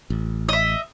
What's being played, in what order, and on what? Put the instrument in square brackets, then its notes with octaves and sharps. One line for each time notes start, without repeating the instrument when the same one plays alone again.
[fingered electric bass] A1
[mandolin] D#5 E5